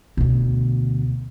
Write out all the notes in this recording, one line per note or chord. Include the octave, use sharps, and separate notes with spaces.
D2 B2